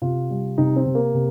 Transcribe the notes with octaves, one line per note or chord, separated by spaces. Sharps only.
C3 F4
G3
C3 D#4
C4
C3
A#3
C3